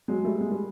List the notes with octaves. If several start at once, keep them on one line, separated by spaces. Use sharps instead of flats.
F#3 G#3
G3 A3
G#3
G3